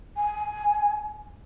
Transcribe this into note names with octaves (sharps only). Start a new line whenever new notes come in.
G#5